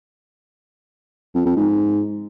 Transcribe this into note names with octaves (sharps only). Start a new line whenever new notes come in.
F2
F2
G#2